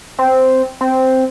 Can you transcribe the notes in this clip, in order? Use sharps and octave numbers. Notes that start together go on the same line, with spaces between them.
C4
C4